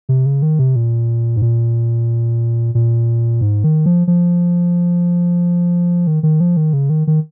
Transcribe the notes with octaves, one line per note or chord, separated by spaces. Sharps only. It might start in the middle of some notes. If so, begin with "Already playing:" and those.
C3
C#3
D#3
C3
A#2
G#2
A#2
A#2
G#2
D#3
F3
F3
D#3
D#3
F3
D#3
C#3
D#3
D#3